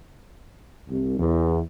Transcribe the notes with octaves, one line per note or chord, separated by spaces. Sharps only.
C2
E2